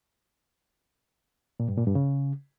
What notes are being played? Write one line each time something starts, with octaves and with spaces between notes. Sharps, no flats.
A#2
G2
A#2
G2
C#3